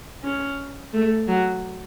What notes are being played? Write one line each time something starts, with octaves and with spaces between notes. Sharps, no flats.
C#4
A3
F#3